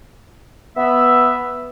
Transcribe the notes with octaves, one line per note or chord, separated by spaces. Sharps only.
B3 E5